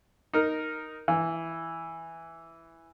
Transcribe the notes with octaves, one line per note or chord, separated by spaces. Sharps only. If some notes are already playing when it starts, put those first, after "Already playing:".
D#4 A#4
E3